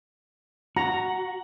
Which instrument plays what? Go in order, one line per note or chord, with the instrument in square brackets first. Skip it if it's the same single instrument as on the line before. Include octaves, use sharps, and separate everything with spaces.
[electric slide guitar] F#4 [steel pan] A#5